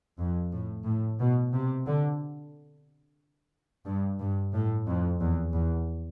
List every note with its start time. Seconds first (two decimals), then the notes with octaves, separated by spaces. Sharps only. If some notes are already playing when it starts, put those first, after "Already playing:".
0.19 F2
0.52 A2
0.86 A2
1.19 B2
1.53 C3
1.86 D3
3.86 G2
4.20 G2
4.53 A2
4.87 F2
5.20 E2
5.53 E2